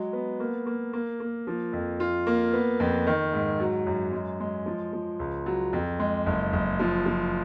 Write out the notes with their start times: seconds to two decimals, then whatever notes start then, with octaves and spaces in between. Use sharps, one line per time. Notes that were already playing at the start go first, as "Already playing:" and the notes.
Already playing: F#3 G#3
0.13 B3
0.40 A#3
0.66 A#3
0.93 A#3
1.20 A#3
1.47 F3
1.73 F2
2.00 F4
2.27 A#3
2.53 B3
2.80 F2
3.07 D#3
3.33 G#2
3.60 F#3
3.87 F#2
4.13 G#3
4.40 G#3
4.66 F3
4.93 F3
5.19 C#2
5.46 F#3
5.73 F2
5.99 G#3
6.26 F#1
6.53 F#1
6.80 F3
7.06 F3